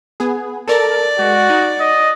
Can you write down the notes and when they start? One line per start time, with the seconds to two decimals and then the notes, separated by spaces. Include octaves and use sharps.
0.20 B3 G#4
0.68 A4 A#4 D5 A5
1.19 G#3 F#4
1.50 D#4
1.80 D#5